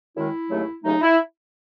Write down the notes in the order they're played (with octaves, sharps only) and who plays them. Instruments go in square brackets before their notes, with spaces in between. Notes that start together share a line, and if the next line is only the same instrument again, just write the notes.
[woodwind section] F#2 D#3 G#3 E4
D#2 C#3 F#3 A3
D#2 C#3 F#3 A3 D#4
E4